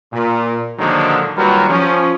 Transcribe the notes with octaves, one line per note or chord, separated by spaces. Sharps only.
A#2
A#2 D3 D#3 F3 F#3 G#3
D#2 F#3 G3 F4 A#4 B4
F3 C#4